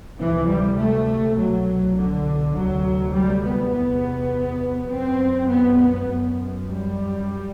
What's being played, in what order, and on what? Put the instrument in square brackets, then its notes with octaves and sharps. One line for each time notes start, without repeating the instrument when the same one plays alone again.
[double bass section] D2 C3 E3
G3
A3
C2 B2 F#3
D3
D2 C3 F#3
G3
B3
E2 C3 B3
F#2 C4
B3
B3
F#2
G3